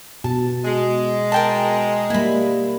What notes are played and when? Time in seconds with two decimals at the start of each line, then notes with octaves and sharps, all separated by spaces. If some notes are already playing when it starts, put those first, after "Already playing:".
0.24 B2 A5
0.64 G#3
1.32 A#4 G5 A5
2.10 G3 A#3 E4 B5